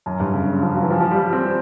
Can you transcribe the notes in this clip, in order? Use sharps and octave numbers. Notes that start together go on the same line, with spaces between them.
F#2
G2
C#3
C#3
F3
F#3
E3
F3
F3
G3
G3
C4